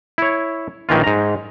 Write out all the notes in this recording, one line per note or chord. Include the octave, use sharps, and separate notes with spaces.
E4 C#5
A#1 D#3 E3 F4
G#2 A#5